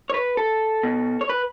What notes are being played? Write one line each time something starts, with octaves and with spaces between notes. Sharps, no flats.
C#5
B4
A4
B2
C#5
B4